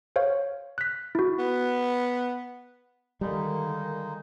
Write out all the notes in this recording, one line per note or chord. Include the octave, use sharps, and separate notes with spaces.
C5 C#5 F5
F#6 B6
E4 F#4
B3
D3 D#3 G3 G#3 A#3 D#4